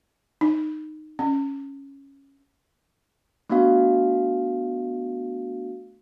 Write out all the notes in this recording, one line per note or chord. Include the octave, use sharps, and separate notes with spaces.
D#4
C#4
A3 B3 D4 F#4 F5